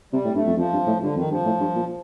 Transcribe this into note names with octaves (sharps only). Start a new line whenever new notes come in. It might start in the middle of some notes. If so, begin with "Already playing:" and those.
C3 G3
A2
G2 A3
F2
F2 F3
G2
A2
G2 D3
F2 D#3
G2 F3
A2
G2
A#2